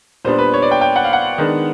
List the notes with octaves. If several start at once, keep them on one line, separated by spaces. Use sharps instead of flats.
A#2 G3 B3 D4 C5
B4
C#5
D5
G5
G5
F#5
F5
F#5
D#3 G#3 B3 D4